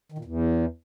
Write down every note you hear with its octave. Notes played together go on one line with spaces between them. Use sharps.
D#3
A#2
E2